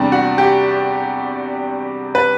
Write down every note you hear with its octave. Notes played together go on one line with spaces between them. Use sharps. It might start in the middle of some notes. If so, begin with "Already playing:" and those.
Already playing: E2 C3 G3 D4
F#4
G4
B4